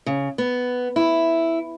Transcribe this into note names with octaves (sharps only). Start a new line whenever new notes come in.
C#3
B3
E4